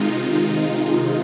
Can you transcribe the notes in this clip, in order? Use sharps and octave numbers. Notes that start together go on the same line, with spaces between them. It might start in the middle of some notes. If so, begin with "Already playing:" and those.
Already playing: C3 D#3 G#3 D#4 F4